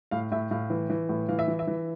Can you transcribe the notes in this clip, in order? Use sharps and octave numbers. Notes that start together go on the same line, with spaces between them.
A2 F5
A2 E5
A2 F5
E3
E3
A2
E3 F5
E5
E3
E5
E3